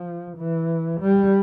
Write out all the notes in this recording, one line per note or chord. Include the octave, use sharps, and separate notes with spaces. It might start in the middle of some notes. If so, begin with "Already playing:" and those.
Already playing: F3
E3
G3